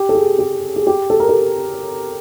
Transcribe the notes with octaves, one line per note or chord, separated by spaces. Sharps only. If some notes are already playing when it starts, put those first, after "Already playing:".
Already playing: G4
A4
G#4
G4
G#4
G4
A4
A#4
A4